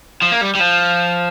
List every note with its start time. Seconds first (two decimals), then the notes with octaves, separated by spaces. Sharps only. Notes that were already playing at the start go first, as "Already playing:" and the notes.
0.22 F3
0.31 A#3
0.41 G3
0.55 G3
0.59 F3